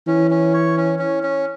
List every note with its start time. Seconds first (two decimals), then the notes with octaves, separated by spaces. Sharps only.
0.07 E3 C#4
0.31 C#4
0.54 C#5
0.77 C#4
0.99 C#4
1.23 C#4